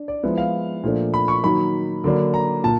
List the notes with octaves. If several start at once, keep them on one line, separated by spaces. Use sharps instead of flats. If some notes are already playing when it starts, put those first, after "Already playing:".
Already playing: D4
D5
F3 G#3 B3 E4
F5
A#2 F3 A3 D4
B5
C#6
D#3 F#3 A#3 D#4 B5
D3 F#3 A#3 D4
A#5
A#2 A5